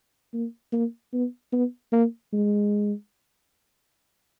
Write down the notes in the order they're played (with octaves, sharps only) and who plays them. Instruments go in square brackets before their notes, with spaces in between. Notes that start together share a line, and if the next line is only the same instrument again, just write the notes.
[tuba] A#3
A#3
B3
B3
A#3
G#3